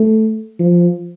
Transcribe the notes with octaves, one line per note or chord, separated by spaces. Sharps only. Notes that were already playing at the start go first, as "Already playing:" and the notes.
Already playing: A3
F3